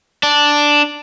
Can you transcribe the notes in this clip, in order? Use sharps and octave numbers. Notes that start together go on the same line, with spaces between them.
D4